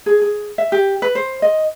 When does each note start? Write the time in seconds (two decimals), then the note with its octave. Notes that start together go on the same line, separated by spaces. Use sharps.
0.06 G#4
0.22 G#4
0.58 E5
0.72 G4
1.02 B4
1.15 C5
1.42 D#5